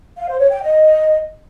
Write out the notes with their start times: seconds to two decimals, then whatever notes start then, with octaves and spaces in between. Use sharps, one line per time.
0.17 F5
0.29 C5
0.40 C#5
0.51 G5
0.62 D#5